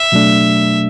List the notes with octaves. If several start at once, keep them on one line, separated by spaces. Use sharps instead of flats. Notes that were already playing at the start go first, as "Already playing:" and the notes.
Already playing: E5
B2 F#3 A3 D4